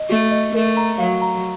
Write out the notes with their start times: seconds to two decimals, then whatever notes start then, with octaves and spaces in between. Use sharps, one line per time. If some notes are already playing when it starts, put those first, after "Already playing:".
Already playing: D#5
0.09 A3 F#4
0.31 D#5
0.54 A3 A#4
0.77 A#5
0.98 F#3 F5
1.22 A#5